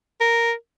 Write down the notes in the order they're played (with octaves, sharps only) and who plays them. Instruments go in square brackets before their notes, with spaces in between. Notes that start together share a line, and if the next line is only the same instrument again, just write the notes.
[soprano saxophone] A#4